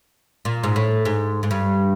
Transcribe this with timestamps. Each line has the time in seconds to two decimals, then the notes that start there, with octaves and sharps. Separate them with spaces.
0.45 A#2
0.64 G#2
0.76 A2
1.05 G#2
1.43 G#2
1.51 G2